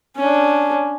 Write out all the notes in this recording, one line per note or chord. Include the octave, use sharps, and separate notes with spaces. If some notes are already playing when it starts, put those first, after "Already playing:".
C#4 D4